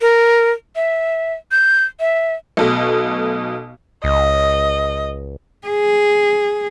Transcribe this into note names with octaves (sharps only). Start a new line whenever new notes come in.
A#4
E5
G6
E5
B1 B2 A3
C#2 D#5
G#4